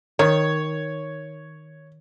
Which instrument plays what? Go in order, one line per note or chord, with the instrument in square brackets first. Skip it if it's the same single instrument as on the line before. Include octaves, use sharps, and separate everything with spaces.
[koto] D#3 [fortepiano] C#5